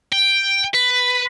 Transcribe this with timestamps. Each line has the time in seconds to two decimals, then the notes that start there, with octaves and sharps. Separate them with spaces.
0.13 G5
0.74 B4